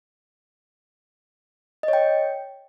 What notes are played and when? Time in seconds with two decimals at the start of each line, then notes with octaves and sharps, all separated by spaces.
1.83 D#5
1.88 C#5
1.93 G5